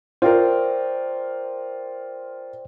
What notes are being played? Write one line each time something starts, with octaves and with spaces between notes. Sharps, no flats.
F4 A#4 C5 D5 G5